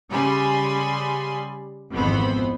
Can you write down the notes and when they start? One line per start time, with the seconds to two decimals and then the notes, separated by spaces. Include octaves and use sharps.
0.11 C#3 G3 G#5 B5 C6
1.93 G#1 F2 E3 B3 C5 B5